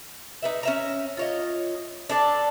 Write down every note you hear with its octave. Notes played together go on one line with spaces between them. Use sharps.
D#4 B4 E5
C#4 E5 A#5
F4 C#5 D#5
D4 A4 D5